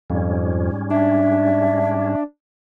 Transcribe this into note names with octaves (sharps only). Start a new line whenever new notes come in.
F2 G#2 G3 C#4
D4 E5